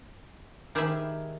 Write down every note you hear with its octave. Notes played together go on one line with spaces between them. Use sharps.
D#3 G4 G#4 C5 E5 B5